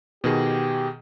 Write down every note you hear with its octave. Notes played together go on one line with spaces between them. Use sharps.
B2 D#3 G4 G#4